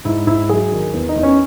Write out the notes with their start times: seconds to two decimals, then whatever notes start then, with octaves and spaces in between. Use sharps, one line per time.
0.05 G#2 E4
0.27 G#2 E4
0.49 F#3 G#4
0.72 D#3
0.94 E2
1.09 D#4
1.16 E2
1.23 C#4